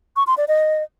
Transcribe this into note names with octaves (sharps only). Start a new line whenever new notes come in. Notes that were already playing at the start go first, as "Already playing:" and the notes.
C#6
C6
D5
D#5